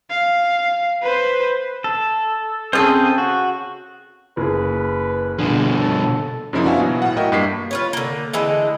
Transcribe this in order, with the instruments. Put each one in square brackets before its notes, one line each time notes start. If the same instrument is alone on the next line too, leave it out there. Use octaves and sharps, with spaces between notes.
[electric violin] F5
B4 C5
[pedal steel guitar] A4
[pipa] C#3 A4 [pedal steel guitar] C4 G#4 C5
[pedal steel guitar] F#4
[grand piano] F#1 G#4 [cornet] B4
[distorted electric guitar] B2 F3 [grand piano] D3 [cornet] G#4
[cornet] A4
[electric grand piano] F#2 C#3 F3 A#3 D#4 E4
B3 D4 F#4 E5 F5 G#5
B2 E3 F#3
A2 F#5
E4 F#4 A#4 D#5 E5 G5
G2 A#3 B6 C7
[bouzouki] F4 B4 C#5
D3 A#3
D3 E3 G#3 A3